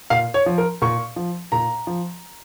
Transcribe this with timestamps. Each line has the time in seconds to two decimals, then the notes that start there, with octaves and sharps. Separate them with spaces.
0.10 A#2 F5
0.34 C#5
0.46 F3
0.58 A#4
0.82 A#2 C#6
1.16 F3
1.52 A#2 A#5
1.87 F3